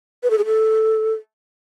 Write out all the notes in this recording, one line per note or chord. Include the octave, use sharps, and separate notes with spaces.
B4
A4
G#4
A4